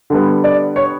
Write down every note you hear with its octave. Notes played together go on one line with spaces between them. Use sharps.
D3 G3 B3
D5
C#5